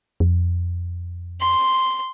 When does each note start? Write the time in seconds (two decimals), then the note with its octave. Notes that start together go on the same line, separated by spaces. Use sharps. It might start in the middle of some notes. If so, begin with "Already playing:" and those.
0.20 F2
1.41 C6